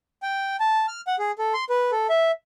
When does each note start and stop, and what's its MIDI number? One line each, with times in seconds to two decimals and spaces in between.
0.22 0.56 79
0.60 0.86 81
0.88 1.01 89
1.07 1.16 78
1.19 1.31 68
1.38 1.53 69
1.54 1.64 84
1.69 1.91 71
1.92 2.07 69
2.09 2.31 76